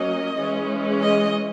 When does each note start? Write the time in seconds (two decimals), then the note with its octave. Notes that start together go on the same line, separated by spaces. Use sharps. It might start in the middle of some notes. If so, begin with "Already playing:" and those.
Already playing: F#3 A#3 C#4 D#5
0.37 E3 G#3 C#4
1.01 D#5